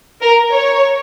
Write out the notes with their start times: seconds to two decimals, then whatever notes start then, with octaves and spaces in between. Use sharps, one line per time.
0.22 A#4
0.52 C#5